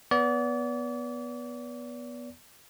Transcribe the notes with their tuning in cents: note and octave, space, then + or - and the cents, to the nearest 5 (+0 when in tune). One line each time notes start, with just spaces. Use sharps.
B3 -10 D5 -35